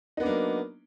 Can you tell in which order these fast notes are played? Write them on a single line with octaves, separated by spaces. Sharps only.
D#4 B3 D4 A#3 F#3